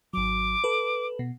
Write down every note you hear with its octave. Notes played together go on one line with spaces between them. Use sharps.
G#1 F#3 D6
A4 B4
B2